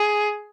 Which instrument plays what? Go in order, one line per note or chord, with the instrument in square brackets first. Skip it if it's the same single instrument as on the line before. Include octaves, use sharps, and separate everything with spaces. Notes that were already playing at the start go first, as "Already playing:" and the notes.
Already playing: [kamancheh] G#4